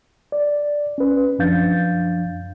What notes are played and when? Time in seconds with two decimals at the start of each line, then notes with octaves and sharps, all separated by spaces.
0.32 D5
0.98 C#4 B4
1.39 F#2 F3 D4 F5 G6 A6